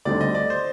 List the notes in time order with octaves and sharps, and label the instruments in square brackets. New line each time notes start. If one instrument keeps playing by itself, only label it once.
[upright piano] D2 D3 G3 C4 D#4 [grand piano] D5
[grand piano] D#5
D5
C5